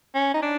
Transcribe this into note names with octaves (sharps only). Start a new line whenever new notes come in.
C#4
D#4
D4